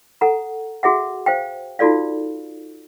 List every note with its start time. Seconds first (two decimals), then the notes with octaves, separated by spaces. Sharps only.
0.21 A4 F#5 A#5
0.83 F#4 G#4 E5 F#5
1.26 C5 F5 G5
1.79 D#4 F4 F#4 A4 D5 F5